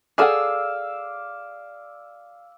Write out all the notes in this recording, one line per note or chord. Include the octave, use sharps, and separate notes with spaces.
G#4 A4 D5 F5 F#5 E6